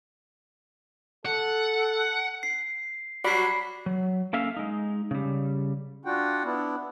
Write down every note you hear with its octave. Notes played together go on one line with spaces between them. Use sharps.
A4 F#5
C7
F#3 G3 F#4 B5 B6 C7
F#3
A#3 C#4 A4 E5 F5
G#3 D#4
C#3 G3
D4 F4 F#4 F#5 G5
B3 D4 E4